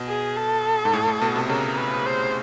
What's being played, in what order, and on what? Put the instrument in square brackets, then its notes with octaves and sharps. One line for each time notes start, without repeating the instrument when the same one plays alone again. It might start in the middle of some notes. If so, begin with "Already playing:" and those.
Already playing: [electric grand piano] B2
[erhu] G#4
A4
[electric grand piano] G#2
A2
A2
B2
C3
[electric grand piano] C#3 [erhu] A#4
[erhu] B4
C5